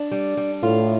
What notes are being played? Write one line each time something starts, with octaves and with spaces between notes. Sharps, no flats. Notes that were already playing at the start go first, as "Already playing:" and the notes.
Already playing: D4
G3
G3
A2 F4